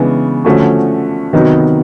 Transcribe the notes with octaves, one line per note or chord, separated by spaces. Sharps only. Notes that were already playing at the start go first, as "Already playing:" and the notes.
Already playing: C#3 E3 G#3 B3 D4
D3 F3 A3 C#4 F#4
C3 D#3 F#3 B3 D#4